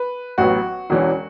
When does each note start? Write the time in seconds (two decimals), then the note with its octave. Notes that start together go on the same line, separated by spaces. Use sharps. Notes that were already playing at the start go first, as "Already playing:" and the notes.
Already playing: B4
0.38 A1 A2 F#3 B3 F#4
0.90 E1 E2 E3 C#4